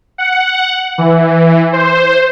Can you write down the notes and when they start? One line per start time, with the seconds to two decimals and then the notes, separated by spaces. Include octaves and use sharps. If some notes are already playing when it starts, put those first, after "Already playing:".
0.18 F#5
0.98 E3
1.73 C5